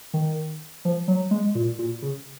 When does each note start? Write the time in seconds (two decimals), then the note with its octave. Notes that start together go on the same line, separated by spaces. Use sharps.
0.13 D#3
0.85 F3
1.08 F#3
1.31 G#3
1.55 A#2
1.79 A#2
2.02 C#3